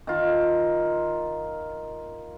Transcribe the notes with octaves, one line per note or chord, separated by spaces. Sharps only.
D#3 F4